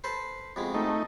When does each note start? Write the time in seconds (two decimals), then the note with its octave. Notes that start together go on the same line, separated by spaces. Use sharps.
0.04 A4 B4 C5
0.56 F2 B2 G#3
0.74 A3 D#4